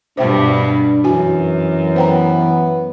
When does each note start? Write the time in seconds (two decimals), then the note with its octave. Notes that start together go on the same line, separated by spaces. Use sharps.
0.17 G2 B2 D4 C5 E5 G5
1.04 F#2 E3 F#4 G#5
1.96 B3 C5 G5 A#5